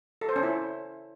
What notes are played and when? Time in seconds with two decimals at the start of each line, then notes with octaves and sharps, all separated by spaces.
0.21 A4
0.29 C5
0.36 C#4
0.43 E4